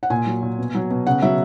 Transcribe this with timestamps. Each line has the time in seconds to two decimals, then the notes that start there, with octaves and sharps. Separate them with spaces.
0.03 F#5
0.10 A#2 G#5
0.26 F#3
0.43 A#2
0.59 B2
0.74 F#3
0.91 B2
1.07 C#3 F#5
1.22 F#3 E5